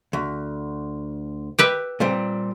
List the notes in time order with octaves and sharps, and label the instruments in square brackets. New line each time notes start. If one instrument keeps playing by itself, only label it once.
[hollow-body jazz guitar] D2
[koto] G4 B4 E5
[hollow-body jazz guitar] A#2 G3 C4